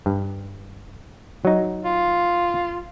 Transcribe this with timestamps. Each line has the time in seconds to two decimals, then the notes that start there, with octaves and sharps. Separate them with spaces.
0.06 G2
1.45 F#3 D#4
1.85 F4